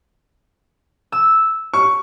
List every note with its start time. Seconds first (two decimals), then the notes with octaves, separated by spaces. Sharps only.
1.12 E6
1.74 C#6